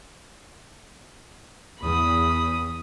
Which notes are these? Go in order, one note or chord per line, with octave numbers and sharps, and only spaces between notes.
E2 B5 D#6